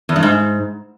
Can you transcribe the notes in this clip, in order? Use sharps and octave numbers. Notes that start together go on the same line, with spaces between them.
E2
G2
G#2